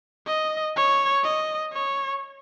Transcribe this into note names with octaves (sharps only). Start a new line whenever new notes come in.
D#5
C#5
D#5
C#5